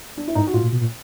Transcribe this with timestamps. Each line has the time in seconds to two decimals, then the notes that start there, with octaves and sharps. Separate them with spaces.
0.18 D4
0.27 E4
0.35 G#2 D#4
0.47 F#4
0.53 A2 F4
0.63 A#2
0.72 B2
0.81 A#2